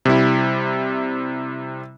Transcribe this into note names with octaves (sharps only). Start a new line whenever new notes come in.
C3 G3 E4